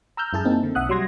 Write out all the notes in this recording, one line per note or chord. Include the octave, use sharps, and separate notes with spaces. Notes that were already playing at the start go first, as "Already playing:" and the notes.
A#5 E6 F6 G6
F#2 E4 G#4 A5
A#3 C4 D#4
D3
B1 E5 F#5 D#6 F#6
F#3 G3 C6 G#6 A#6